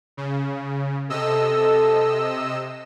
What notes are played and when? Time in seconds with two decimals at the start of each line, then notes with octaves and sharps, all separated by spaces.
0.17 C#3
1.10 C3 A4 D#5 E6